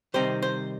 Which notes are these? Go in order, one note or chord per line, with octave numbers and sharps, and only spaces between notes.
C3 D#3 G3 C4 D#4 C5
C5